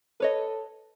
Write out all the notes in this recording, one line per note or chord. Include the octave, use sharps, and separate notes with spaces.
A4 B4 C#5 D#5